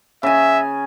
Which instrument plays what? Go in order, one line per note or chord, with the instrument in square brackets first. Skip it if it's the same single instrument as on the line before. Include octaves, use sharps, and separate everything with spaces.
[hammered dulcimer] C#3 G#5 [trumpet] E5